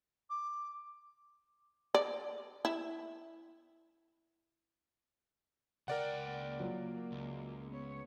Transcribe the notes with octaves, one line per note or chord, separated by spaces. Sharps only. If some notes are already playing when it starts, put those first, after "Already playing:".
D6
D5
E4
C#2 A#4 D5 F#5 G5
A#3
F#3 F4
C#2
B3 C#5